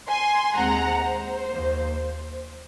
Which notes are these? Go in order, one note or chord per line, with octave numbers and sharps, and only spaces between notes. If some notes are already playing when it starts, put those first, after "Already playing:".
G#5 C6
D#2 D#3 G#3 C4 F#5 A#5
C5
D#2 D#3 A#3